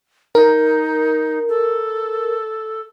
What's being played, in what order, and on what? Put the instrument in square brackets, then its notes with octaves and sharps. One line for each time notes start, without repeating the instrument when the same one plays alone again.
[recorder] D#4 [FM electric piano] A#4
[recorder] A4